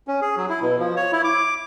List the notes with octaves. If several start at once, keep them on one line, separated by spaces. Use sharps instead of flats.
C#4
G#4
F#3
E4
B2
F3
C#5
E4
D6